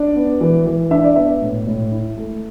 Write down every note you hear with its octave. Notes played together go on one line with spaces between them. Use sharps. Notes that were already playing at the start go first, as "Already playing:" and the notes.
Already playing: D4 D5
B3
E3
E3
D4 E5
D5
B3 E5
A2
A2
E4
A3